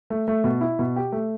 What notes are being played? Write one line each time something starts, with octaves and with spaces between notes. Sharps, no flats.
A3
A3
B2
E4
B2
G4
A3